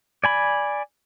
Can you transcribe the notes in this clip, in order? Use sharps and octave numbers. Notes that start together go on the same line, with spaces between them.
D5 G#5 B5